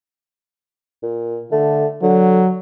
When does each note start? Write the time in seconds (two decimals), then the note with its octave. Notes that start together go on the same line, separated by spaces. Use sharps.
1.03 A#2
1.52 D3 A3
2.02 D3 F#3